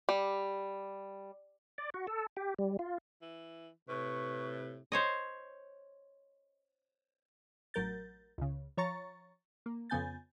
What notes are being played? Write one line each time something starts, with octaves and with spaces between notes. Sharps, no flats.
G3
D5
F#4
A4
G4
G3
F4
E3
A2 C3 B4 C#6
C5 C#5 D#5
A1 F#3 A#4 G6 A6
C#2 C#3
F3 C#5 A#5 C#6 A6
A#3
F2 C#3 B3 G#5 G6 A6